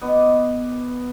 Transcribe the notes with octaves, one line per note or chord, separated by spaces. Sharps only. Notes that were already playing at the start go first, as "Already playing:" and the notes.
B3 D#5 D6